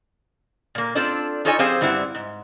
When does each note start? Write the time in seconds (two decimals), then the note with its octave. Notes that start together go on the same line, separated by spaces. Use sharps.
0.75 A#2 A#3
0.95 C4 D4 F4 A4 C5 D5
1.45 D#4 F4 A4 C#5 D#5 G#5
1.59 F3 C4 G4 G#4 C5 F5
1.81 G2 G3 C4 E4 G#4 F#5
2.15 G#2